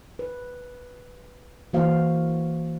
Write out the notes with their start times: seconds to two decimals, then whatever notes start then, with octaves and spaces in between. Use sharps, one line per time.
0.19 B4
1.73 E3 A#3 F#4 C5 F5